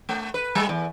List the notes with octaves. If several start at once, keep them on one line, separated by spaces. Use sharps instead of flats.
A3
B4
G3
E2